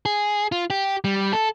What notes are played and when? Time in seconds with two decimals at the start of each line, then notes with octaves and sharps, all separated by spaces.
0.06 G#4
0.52 F4
0.70 G4
1.04 G3
1.33 A4